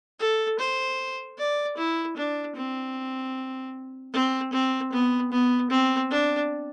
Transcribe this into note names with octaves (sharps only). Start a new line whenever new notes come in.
A4
C5
D5
E4
D4
C4
C4
C4
B3
B3
C4
D4